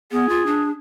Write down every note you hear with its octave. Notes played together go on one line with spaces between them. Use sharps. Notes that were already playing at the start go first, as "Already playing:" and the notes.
B3 G#4
F4
D4